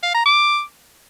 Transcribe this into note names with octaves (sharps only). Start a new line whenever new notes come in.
F5
A#5
D6